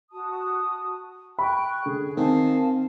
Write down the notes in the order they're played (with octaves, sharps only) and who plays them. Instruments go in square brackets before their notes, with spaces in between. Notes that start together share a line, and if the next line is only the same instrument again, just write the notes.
[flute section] F#4 A5 D#6
[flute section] G5 C#6 F#6 [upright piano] B5
[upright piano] D3 [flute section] G#4
[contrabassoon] D#3 [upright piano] C4 [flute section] F5 G#5 A5